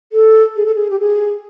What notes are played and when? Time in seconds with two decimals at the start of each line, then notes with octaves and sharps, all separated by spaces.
0.12 A4
0.56 G#4
0.66 A4
0.75 G#4
0.90 G4
0.99 G#4